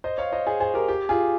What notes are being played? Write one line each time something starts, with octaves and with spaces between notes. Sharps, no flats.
C5 D#5
C#5 F5
C5 D#5
G#4 C5
G#4 C5
G4 A#4
G4
F4 G#4